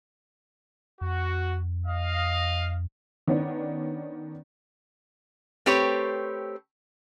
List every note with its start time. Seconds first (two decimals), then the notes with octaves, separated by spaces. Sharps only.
1.01 F2 F#4
1.86 D#5 F5
3.27 D#3 B3 C#4 D4
5.66 A3 C4 G4 B4 C#5